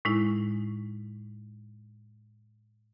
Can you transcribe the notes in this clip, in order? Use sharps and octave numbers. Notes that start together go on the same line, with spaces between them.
A2 G#3 D#4 E4